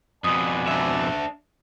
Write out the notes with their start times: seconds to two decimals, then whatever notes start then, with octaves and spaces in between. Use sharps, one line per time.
0.24 F2 B2 D5 F#5 G#5 D#6
0.68 D4 E5